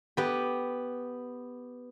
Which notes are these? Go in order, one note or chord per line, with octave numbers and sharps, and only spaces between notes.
B3 G4